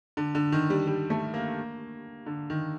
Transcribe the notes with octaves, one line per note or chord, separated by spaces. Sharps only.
D3
D3
D#3
G3
G3
A3
A#3
D3
D#3